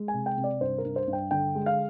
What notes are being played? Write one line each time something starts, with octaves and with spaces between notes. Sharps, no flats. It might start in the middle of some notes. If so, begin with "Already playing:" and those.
Already playing: G#3
G#5
C3
G5
C3
D5
G2 C5
A#4
G2
C5
G2
G5
D3 G5
G#3
F5